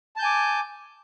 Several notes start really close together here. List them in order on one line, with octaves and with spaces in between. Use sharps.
A5 G6 G#5 D6